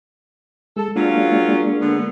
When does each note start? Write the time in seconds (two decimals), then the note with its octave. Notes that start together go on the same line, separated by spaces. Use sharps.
0.76 G#3 A4
0.96 F#3 G#3 A#3 C#4 D4 F4
1.81 D3 B3